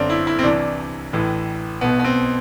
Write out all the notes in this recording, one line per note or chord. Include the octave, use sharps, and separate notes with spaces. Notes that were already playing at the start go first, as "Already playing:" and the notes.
Already playing: G1 F#2 D3 C4 D4
E4
E4
C4
C2 C3 E3 D4
A1 A2 E3
B1 B2 B3
B3
C4